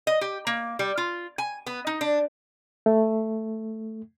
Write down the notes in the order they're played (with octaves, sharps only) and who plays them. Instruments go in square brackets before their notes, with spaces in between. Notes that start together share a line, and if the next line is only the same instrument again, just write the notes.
[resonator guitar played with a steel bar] D#5
G4
A#3
G3
F4
G#5
B3
D#4
D4
[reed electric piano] A3